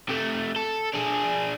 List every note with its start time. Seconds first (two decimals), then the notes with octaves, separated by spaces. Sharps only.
0.09 C3 A3
0.56 A4
0.94 D4 G#4